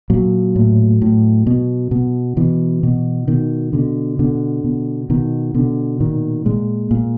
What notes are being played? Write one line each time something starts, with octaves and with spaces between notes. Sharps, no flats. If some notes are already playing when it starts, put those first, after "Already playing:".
A#2 F#3
A2
A2
B2
B2
B2 E3
B2
B2 D#3
B2 D3
B2 D3
B2
B2 D#3
B2 D3
A#2 D#3
A#2 G#3
A#2